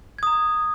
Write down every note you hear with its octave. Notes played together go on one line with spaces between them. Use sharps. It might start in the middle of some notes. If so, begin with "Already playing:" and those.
A#5 D#6 G#6